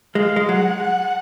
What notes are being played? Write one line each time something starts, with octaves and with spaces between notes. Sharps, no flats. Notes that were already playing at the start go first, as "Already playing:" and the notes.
G#3 F5
G#3
F#3 F#5
F#5